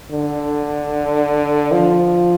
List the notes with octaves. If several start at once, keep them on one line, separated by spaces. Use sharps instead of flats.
D3
F3